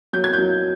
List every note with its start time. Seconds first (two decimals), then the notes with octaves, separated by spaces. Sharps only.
0.13 F#3 G6
0.24 G#6
0.33 F#3 G6